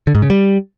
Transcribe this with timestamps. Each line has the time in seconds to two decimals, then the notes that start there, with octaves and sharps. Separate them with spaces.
0.07 D3
0.15 G#2
0.22 C#3
0.30 G3